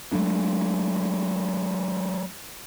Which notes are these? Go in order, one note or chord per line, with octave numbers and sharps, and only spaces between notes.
F#3 G#3 A3 D4